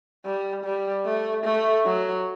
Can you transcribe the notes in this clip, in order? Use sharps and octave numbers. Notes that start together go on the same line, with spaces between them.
G3
G3
A3
A3
F#3